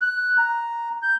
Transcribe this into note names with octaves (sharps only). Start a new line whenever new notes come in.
F#6
A#5
G6